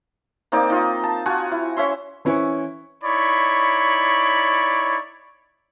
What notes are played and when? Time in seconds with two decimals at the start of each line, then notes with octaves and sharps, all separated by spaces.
0.52 A#3 C4 D#4 D5
0.70 D#4 F4 D#5
1.04 A5
1.26 F4 F#4 F#5 G#5
1.52 E4
1.77 C#4 E5 C6
2.25 E3 C#4 E4 B4 C5 C#6
3.04 D#4 E4 C#5 D5 B5 C#6